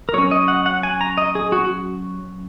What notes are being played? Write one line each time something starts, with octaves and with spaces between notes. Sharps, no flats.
A#4
F#3 C#4 C#5
D#5
F#5
F#5
G#5
A#5
D#5
G#4
F#4